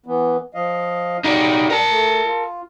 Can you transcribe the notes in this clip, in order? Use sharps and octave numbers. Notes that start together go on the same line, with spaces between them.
E3 B3
F3 D#5 F5
G3 D#4 F#4
A#4 A5
A3
F4